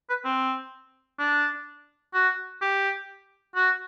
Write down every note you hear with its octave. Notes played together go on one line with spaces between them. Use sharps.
B4
C4
D4
F#4
G4
F#4